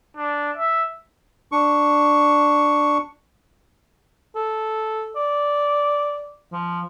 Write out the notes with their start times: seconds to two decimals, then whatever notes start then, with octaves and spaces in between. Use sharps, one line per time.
0.17 D4
0.57 E5
1.52 D4 C#6
4.36 A4
5.16 D5
6.53 F3